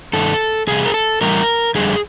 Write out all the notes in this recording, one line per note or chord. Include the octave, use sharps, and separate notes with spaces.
G2 D#3 A4
E2 C3 G3 G#4
A#4
A4
A2 E3 G3 A#4
F2 D3 G3 G#4